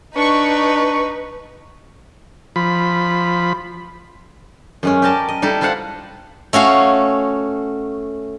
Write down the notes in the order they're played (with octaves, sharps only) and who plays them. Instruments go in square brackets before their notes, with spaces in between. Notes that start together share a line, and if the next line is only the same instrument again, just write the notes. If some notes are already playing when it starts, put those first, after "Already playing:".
[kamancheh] D4 [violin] D#4 B4 [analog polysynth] C#6
[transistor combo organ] F3 B5
[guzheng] F#2 G#3 C#4
G4 A#4 D5 D#5 A5
D#5
G3 D#4 E4 A4
E4 F4 C5 F5 F#5
A3 C#4 F#4 F5